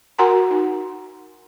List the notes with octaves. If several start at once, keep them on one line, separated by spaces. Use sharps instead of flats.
F#4 A#4 F#5 G#5 A#5 C6
D#4